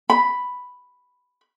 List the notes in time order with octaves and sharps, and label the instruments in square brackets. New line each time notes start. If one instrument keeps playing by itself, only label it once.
[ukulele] B5